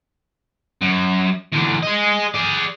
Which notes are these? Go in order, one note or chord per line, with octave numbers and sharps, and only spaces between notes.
F#2
E2 D3
G#4 D#5
G#4 D5